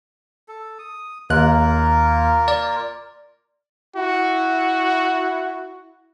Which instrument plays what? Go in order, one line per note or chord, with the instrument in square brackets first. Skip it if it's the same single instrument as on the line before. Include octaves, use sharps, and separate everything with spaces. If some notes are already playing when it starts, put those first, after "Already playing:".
[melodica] A4
D#6
[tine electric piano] D#2 F#6 [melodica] A#3 F4 A#4
[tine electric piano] D5
[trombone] E4 [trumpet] F#4